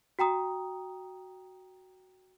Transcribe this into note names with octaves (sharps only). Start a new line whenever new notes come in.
F#4 G5 A#5 D#6